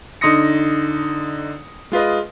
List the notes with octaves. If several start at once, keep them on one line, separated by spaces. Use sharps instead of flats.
D3 D#4 C6 D#6 A#6 C#7
G#3 F4 B4 D#5